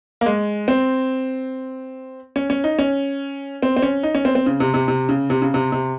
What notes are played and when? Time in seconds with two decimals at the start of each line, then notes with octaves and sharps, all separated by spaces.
0.21 A#3
0.26 G#3
0.68 C4
2.36 C#4
2.50 C#4
2.64 D#4
2.79 C#4
3.63 C4
3.77 C4
3.82 C#4
4.03 D#4
4.15 C#4
4.25 C4
4.35 C4
4.46 C#3
4.60 C3
4.74 C3
4.88 C3
5.09 C#3
5.30 C3
5.42 C#3
5.54 C3
5.72 C3